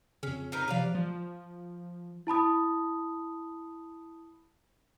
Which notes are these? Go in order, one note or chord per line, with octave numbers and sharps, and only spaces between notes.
F2 C#3 C#4
D#4 A#4 B4
C3 F3 B4 D5 F5
F3
E4 A5 B5 D#6